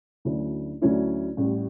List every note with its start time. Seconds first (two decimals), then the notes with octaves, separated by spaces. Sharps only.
0.25 D2 D3 F#3 C#4 E4
0.82 D2 D3 F#3 C#4 E4
1.37 A1 A2 G3